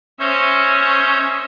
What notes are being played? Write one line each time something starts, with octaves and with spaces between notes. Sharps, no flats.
C#4 C5 C#5 D#5 E5 G6